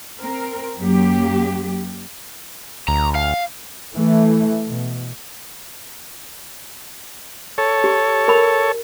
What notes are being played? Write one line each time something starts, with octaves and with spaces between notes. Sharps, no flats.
C4 A#4
F#2 F#3 A#3 G4
D2 A#5
F5
E3 A3
B2
A4 C#5
G4
A#4 B5